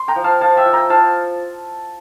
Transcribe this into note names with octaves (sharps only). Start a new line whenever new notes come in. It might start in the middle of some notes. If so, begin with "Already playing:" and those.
Already playing: C6
G5 A#5
F3
F5 A5
F3 F5 A5
E5 G5
F3
G5 A#5
F3 F5 A5